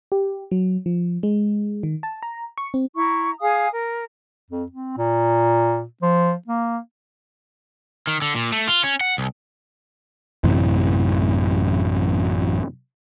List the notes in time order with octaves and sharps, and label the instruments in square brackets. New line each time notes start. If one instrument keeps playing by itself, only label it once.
[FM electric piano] G4
F#3
F3
G#3
D#3
A5
A#5
C#6
C4
[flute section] E4 A#5 C#6
G#4 F5 G#5 D#6
A#4
[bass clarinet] F2
C4
A#2
F3
A#3
[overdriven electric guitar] D#3
D3
A#2
A3
F4
C#4
F#5
C2
[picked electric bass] A1 F#2 C3 E3